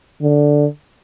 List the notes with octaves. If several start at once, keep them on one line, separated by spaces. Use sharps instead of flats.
D3